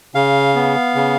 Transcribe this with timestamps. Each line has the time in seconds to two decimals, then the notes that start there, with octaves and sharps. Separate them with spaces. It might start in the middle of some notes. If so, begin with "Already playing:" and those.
0.15 C#3 F5
0.55 B3
0.95 C#3